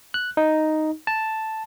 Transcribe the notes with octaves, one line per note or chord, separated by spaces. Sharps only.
F#6
D#4
A5